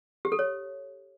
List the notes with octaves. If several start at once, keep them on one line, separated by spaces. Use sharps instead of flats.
G4
A4
C#5